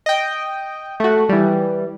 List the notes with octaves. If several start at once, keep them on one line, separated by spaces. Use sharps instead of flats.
D#5 G5
A3 F#4
E3 G3